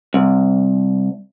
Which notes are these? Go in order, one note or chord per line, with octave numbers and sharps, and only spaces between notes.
C2